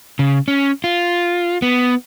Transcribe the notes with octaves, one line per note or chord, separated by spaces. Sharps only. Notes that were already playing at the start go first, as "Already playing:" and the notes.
C#3
C#4
F4
B3